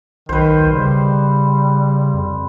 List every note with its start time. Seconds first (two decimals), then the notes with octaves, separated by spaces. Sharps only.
0.29 B1 D#3 B4 C5
0.60 D2
0.73 C#3 G3
2.14 F2